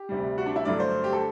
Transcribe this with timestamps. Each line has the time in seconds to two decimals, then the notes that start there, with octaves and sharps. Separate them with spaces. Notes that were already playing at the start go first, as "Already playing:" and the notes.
Already playing: G4
0.09 D2 C3 G3
0.38 F#4
0.46 D4
0.56 E4
0.65 G2 D3 F#3 A3 D5
0.80 C5
1.04 G4
1.13 A4